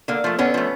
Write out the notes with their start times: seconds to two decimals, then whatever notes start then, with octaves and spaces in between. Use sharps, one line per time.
0.08 D3 A#3
0.24 F3 A3
0.39 D3 B3 C#4
0.54 F3 A3